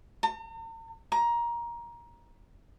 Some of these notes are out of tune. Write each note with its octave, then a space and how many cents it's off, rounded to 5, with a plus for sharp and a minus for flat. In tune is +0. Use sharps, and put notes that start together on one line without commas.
A#5 -45
A#5 +20